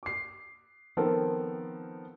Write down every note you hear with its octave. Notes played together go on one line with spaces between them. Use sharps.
D6 C7
D#3 F3 B3 C4 A4 A#4